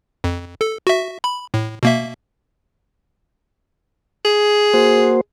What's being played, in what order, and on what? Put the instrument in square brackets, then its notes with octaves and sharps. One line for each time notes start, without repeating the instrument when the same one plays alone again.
[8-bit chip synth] F2
A4
F#4 E5
B5
A2
B2 A#3 E5
[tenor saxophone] G#4
[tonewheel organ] A#3 F#4 C5